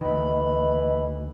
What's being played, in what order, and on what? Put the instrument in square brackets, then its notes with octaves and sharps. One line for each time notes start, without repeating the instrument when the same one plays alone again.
[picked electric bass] D2 D#3 [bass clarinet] E3 [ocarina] D#5 [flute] B5